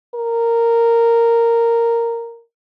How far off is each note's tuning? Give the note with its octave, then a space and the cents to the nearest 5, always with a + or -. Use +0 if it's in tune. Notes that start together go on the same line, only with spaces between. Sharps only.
A#4 -10